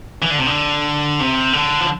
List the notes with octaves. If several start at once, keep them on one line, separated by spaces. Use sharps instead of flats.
E3
D3
C3
D3
C3
D3
F3